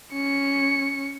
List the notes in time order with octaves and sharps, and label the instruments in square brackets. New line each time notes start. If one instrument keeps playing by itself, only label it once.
[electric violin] C#4 C#7